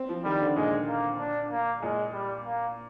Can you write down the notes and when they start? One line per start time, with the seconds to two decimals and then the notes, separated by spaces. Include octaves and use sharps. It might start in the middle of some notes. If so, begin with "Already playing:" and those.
Already playing: C4
0.09 F3
0.25 D#3 G3
0.41 D3
0.56 A#2 G#3
0.88 A#3
1.19 D4
1.50 A#3
1.81 A#2 G#3
2.13 G3
2.45 A#3